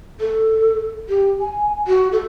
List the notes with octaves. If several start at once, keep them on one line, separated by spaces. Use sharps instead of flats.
A4
G4
G#5
F#4
A4